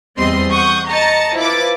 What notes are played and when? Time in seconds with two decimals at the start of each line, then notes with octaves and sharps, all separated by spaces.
0.18 E2 G3 C4 D#5 C6
0.52 F#5 C#6 D#6 G6
0.90 D#5 A5 A#5 A6 C#7
1.36 F3 E4 B4 D6 A6